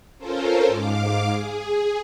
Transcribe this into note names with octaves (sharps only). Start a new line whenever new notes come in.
C#4 F4 A4 A#4 C5
G#2 F5 D6
G#4